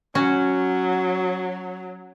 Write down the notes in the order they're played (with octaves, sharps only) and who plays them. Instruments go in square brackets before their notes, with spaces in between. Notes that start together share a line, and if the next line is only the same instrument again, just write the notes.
[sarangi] F#3 [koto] C#4 F#4